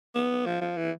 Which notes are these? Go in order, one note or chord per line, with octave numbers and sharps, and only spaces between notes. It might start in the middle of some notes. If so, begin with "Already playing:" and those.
B3
F3
F3
E3